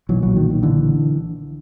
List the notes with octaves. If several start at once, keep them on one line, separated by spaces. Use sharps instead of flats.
B1 A#2 E3 F#3
E3 F#3
D#3
D#3
D3 E3